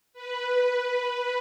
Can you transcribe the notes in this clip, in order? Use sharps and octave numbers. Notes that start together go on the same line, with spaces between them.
B4